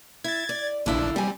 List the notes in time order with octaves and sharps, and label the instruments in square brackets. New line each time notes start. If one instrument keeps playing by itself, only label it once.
[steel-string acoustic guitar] E4 [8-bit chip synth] G#6 A6
[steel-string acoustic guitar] D5
[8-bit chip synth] A#1 D4 [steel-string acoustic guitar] D3 E4 F5
[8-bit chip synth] G3 [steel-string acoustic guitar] C4 G#5